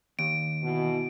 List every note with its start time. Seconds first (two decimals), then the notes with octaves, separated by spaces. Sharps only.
0.19 D#2 D7
0.63 B2 E3